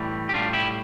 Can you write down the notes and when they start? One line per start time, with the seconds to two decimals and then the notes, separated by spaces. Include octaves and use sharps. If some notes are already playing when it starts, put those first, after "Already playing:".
Already playing: A2 E3 G3
0.29 G4
0.33 A2 G3 D4 F4
0.53 E4 G4